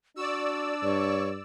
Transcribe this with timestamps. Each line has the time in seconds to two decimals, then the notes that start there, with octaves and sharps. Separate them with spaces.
0.16 D4 F#4 D5 E6
0.83 G2 C#5